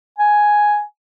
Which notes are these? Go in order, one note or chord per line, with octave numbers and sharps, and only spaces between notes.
G#5